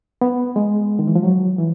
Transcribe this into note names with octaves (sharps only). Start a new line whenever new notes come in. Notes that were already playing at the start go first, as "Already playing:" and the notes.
B3
G#3
D#3
E3
F3
F#3
E3